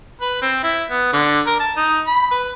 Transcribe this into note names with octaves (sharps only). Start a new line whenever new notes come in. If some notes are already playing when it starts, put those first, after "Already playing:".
B4
C4
E4
B3
D3
A#4
A5
D#4
B5
B4